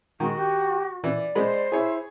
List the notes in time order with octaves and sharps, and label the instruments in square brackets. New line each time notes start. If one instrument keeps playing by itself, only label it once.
[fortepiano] D#3 [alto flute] G#3 [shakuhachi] F#4
[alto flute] G4
[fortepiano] E3 [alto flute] D5
[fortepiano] G#3 B5 [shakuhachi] C5
[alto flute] E4 [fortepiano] G#4 C#5